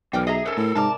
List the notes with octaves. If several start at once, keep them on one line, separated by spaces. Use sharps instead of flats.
B1 E3 A#4 D5 G5
G#4 D#5 E5 A#5
G#2 C#4 A4 A#4
A2
G#2 C3 A#4 D5 A5